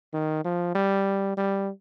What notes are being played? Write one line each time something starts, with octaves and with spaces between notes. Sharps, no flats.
D#3
F3
G3
G3